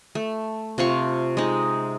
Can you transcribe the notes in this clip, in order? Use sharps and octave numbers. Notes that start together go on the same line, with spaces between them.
A3
C3 F4 F5 C#6
G#3 D#4